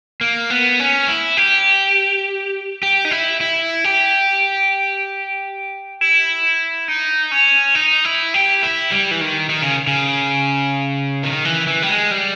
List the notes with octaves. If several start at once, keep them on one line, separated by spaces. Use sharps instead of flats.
A#3
B3
C#4
E4
G4
G4
D#4
E4
E4
G4
E4
D#4
C#4
D#4
E4
G4
E4
G3
E3
D#3
D#3
C#3
C#3
D#3
E3
E3
G3
G#3
G3